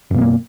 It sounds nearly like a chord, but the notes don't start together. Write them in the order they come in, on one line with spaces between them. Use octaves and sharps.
F#2 B2 B3 A#3